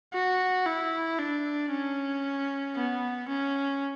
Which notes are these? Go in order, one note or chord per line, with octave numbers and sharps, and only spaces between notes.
F#4
E4
D4
C#4
B3
C#4